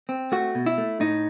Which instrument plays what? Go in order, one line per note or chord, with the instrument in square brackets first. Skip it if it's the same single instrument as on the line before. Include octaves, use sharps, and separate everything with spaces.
[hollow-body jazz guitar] C4
A3 F#4
B2
E4
A3
A2 D#4